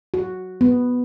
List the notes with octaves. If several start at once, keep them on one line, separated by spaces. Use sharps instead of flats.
F#4
B3